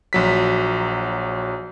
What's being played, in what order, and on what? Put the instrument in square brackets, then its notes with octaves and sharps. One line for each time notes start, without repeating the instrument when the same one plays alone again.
[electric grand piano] A#1 F#3 B6